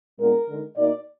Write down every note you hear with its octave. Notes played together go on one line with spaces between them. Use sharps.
A#2 G#3 B3 D4 A#4
D3 G#3 D#4
B2 A#3 D#4 D5